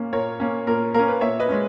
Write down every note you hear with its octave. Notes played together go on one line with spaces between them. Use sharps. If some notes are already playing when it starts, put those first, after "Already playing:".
Already playing: A#2 A#3 C#4
A#2 A#4 C#5
A#3 C#4
A#2 A#4
A#3 C#4 A#4
B4
A#2 C#5 E5
B4 D#5
G#3 C#4